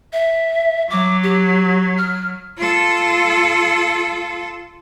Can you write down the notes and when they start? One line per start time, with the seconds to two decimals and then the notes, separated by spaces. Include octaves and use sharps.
0.13 E5
0.90 F#3 D6
1.23 G4
1.98 F6
2.57 F4 A4